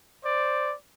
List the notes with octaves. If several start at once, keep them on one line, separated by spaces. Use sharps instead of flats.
C5 D5